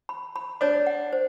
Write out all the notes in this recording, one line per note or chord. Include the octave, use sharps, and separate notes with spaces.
B5
B5
D4 C#5
F#5
C5